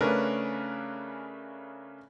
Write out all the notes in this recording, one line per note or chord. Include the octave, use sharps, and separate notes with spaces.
C#3 A3 C#4 D4 A#4 B4